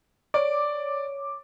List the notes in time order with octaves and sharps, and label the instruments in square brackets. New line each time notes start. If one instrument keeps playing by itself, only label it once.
[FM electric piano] C#5 D6 [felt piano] D5